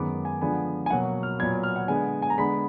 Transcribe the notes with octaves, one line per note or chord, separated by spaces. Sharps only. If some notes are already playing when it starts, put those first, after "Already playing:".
Already playing: F#2 D#3 G#3 B3 D6
G#5
D3 F3 G#3 B3 G#5
G#5
B2 F#3 A#3 F#5
F6
A#2 F#3 B3 G#6
F6
F#5
D3 G#3 B3 G#5
G#5
A#5
D3 G#3 B3 B5